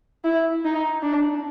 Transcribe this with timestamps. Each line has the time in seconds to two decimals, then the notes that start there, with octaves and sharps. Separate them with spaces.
0.24 E4
0.64 D#4
1.02 D4